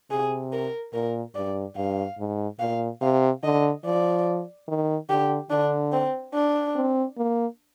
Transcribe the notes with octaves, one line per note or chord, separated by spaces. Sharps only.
C3 G#4
A#4
A#2 A#4
G2 D5
G2 F5
G#2
A#2 F5
C3 F5
D3 D#5
F3 D5
D#3
D3 G4
D3 D4
C4
D4
C4
A#3